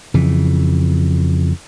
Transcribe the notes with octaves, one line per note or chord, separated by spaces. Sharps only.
F2 C#3 E3